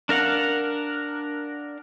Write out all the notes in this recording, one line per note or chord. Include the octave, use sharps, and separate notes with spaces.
D4 A#4 F5 F#5